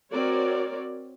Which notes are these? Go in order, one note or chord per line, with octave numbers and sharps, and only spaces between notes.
C4 F#4 A#4 C#5 D5